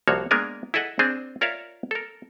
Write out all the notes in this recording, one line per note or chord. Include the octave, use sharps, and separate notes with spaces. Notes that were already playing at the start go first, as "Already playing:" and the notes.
C2 F3 A#3 F#4 C#5
G#3 A#3 B3 D4 A#4 G#5
E4 G#4 A4 D#5 E5 F#5
C4 D4 G#4 C5
F4 A#4 C#5 D5 E5 F5
A4 A#4